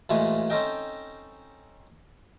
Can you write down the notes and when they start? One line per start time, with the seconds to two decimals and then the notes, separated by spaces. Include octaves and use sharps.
0.09 A1 A#2 E3 G#3 A3 G#5
0.50 C4 C#4 D#4 A4 D#5 G5